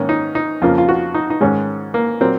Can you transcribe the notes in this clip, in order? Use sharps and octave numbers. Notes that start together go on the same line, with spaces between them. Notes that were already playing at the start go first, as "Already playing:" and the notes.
Already playing: G#2 D#3 A#3 C#4
D#4
D#4
F2 C#3 F3 A#3 F4
F4
F#4
D#4
D#4
G#2 D#3 G#3 C#4
A#3
A#2 F#3 A#3 C4